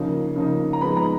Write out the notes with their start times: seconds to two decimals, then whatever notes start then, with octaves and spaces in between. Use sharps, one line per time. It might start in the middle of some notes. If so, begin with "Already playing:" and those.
Already playing: C#3 F3 A#3 D#4
0.36 C#3 F3 A#3 D#4
0.73 A#5
0.81 G#2 F3 G#3 B3 D#4 B5
0.97 A#5